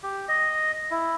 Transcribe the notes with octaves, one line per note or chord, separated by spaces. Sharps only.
G4
D#5
E4